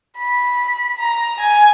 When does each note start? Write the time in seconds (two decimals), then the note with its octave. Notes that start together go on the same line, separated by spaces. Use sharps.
0.19 B5
0.99 A#5
1.40 G#5